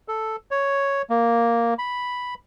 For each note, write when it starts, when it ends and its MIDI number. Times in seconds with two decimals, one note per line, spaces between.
0.08 0.36 69
0.51 1.02 73
1.10 1.74 58
1.78 2.34 83